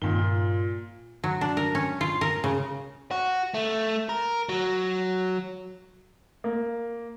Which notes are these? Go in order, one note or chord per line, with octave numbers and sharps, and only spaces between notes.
G2 A#2 D#3 G7
F4
F#3
D4
A#4
C#4
F4
A#4
C#3
F#4
A3
A#4
F#3
A#3